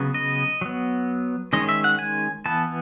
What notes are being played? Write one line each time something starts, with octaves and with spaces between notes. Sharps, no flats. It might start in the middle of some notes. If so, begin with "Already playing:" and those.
Already playing: C#3 F#3 B3
D#5
F#3 B3
D#3 G#3 C#4 D#5
E5
F#5
G#5
E3 B3 A5